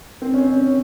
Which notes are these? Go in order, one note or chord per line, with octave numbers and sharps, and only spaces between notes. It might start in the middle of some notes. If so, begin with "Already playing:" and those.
C4
C#4
C#4
C#4